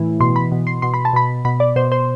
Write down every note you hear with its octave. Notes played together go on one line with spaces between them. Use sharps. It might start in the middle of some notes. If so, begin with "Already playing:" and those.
Already playing: A2 E3
B2 C6
B5
B2
C6
B2 C6
B5
A5
B2 B5
B2 B5
D5
B2 C5
C5